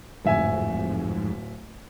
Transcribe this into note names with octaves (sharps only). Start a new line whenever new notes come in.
D1 F2 G#2 E5 G#5